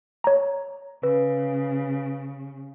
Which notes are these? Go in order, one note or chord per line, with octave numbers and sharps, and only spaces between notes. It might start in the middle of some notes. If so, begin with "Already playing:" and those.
C#5 A#5
C#3 B4